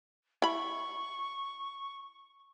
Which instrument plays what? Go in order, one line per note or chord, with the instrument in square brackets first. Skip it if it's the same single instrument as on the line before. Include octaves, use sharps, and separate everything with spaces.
[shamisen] E4 B5 [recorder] C#6